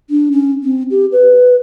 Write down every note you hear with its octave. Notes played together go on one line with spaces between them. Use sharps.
D4
C#4
C4
G4
B4